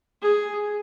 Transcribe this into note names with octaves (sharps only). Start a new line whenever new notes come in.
G#4